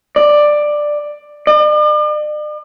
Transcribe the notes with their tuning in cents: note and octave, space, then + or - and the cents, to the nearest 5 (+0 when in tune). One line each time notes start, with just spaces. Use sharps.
D5 +10
D5 +45